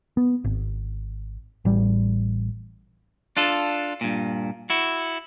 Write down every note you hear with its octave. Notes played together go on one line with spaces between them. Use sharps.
B3
G#1
A1 G3
D4 F4 A4
G2 A#2
E4 F#4